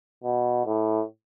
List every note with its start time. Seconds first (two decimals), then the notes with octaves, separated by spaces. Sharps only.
0.24 B2
0.66 A2